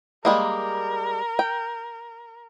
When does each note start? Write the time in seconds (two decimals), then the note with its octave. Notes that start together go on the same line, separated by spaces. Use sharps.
0.25 G3 G#3 A#3 A#4
1.39 G5